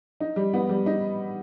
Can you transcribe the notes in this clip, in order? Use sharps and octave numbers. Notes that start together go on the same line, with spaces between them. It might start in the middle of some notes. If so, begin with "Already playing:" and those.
D#4
G3
B3
G3
D#4